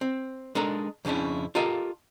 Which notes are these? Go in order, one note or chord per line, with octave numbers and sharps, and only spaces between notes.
C4
G#3 D4 D#4 A4 A#4
F2 C#3 C#4 D4 E4
F4 G4 A4 A#4 D#5 F5